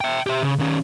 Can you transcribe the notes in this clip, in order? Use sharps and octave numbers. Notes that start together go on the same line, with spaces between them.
E5 G5
G4 E5
C#3
D#3 C#4